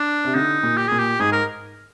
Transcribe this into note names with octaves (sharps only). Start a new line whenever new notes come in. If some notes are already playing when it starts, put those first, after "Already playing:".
Already playing: D4
C3
D3 D#4
A#2
G4
A#2 G#4
G4
G#2 G#4
A#4